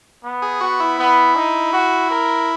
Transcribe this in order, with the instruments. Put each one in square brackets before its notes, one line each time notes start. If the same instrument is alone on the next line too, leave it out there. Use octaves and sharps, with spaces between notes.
[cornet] B3
[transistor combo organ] G#4
[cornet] B3 [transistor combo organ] F#4
[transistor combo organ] E4
[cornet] B3
D#4
F#4
A#4